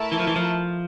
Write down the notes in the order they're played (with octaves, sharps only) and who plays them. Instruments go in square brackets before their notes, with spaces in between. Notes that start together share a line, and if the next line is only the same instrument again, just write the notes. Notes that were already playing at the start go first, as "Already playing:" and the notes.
Already playing: [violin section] A3 E4 A#4 E5 A5
[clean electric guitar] E3
F3
E3
F3